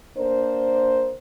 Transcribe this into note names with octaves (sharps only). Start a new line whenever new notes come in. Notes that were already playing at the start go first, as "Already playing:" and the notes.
A#3 D4 A#4 C5